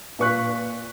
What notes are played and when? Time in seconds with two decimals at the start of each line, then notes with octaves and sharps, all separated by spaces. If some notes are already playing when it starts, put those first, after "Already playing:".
0.19 A#2 B4 C#6 F#6 B6